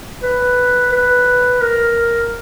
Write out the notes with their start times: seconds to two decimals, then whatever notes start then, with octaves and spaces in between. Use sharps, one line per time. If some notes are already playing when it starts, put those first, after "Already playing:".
0.23 B4
0.92 B4
1.61 A#4